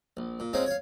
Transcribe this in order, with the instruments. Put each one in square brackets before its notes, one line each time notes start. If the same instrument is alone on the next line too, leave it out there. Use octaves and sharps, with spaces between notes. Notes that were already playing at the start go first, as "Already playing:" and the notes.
[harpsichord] A#1
A#2
G#3 C4 C#4 D#4 F4
C#5 F5